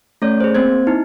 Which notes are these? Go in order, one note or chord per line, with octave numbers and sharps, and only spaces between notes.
A3 C#4 C#5 D5 G6
G#4 C5
A#3 C4 C5 G#6
D#4 E4